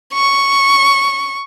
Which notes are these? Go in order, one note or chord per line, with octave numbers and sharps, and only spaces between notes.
C#6